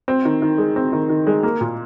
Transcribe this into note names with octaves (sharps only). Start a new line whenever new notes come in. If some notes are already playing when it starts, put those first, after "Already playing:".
C4
D#3
D#3
G#3
C4
D#3
D#3
G#3
A#3
A#2